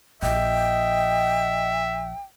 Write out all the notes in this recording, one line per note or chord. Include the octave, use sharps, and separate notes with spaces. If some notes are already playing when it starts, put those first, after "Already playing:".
A#1 D#5 E5 G5